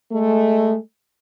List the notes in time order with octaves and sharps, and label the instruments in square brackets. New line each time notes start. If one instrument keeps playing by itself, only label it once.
[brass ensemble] G#3 A3